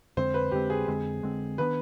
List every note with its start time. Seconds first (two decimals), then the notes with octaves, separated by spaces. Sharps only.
0.17 F2 D3 G#3 C4 C5
0.34 B4
0.52 F2 D3 G#3 C4 G4
0.70 G#4
0.87 F2 D3 G#3 C4
1.23 F2 D3 G#3 C4
1.58 D#3 B3 D4 B4